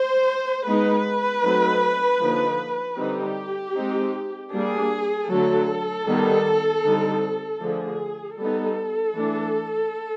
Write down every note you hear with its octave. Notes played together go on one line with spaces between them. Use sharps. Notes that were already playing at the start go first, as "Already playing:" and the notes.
Already playing: C5
G#3 B3 D#4 B4
F#3 A3 C4 D#4
D3 F3 A#3 D#4
D3 G3 C4 D#4 G4
G#3 C4 D#4
G3 A#3 D4 G#4
D3 F#3 A3 A4
D#3 G3 B3 D#4
D3 G3 C4 D#4
D3 F3 A3 G#4
G3 B3 D#4 A4
E3 A3 D4